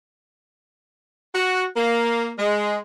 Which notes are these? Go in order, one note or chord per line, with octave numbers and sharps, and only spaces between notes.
F#4
A#3
G#3